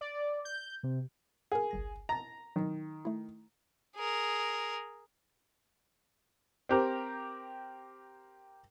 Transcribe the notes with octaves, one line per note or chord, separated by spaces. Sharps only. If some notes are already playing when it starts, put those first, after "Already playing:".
D5
G6
C3
G#4 A#4 F#5
G1 C2 A#6
D#5 A5 A#5 A6
D#3 F#3
A3 E4
G#4 A#4
C4 G4 A#4